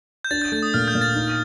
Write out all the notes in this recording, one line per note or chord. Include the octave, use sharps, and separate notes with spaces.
G6
D4 A6
G6
A3 G6
D#6
A#2 F6
G6
A#2
A6
D#4